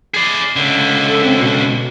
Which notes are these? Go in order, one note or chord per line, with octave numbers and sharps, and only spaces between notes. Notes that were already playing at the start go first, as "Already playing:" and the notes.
G#4 D5
C#2 D3
A4
C4
B2